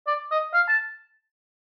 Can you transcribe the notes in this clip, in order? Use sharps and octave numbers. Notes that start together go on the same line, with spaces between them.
D5
D#5
F5
A5